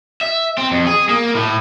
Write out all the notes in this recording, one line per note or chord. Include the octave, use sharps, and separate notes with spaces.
E5
C4
F2
G#4
A#3
A2